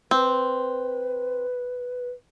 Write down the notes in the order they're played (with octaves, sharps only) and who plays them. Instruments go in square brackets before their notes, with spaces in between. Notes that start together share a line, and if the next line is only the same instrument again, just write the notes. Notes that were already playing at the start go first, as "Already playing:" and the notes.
[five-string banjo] C4 [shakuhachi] B4